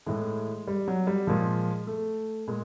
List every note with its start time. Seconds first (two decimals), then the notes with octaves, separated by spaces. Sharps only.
0.06 A2 E3 G#3
0.68 G3
0.88 F#3
1.07 G3
1.27 A#2 F3 G#3
1.87 A3
2.47 A#2 G#3